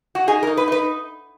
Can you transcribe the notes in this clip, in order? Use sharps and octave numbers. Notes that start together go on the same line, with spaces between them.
F#4
D#4 G#4
A#4
D#4
B4
D#4 B4